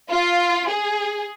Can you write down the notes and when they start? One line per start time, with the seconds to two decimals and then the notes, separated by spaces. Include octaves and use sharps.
0.11 F4
0.69 G#4